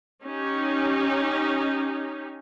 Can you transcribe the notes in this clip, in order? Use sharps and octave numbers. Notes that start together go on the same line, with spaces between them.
C#4 D#4 G4